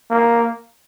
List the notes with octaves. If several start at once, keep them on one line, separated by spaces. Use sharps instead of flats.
A#3